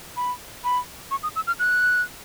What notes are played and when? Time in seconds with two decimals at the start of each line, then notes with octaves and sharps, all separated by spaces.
0.17 B5
0.64 B5
1.11 C#6
1.23 D#6
1.36 E6
1.47 F6
1.59 F#6